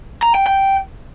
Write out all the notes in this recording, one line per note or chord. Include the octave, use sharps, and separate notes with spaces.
A#5
G5
G5